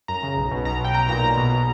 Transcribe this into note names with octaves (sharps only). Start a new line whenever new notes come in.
F#2 A#5
C#3
B1
B2
B1 A#5
B2 G5
B1 A#5
A#2 A#5
B1 A#5
B2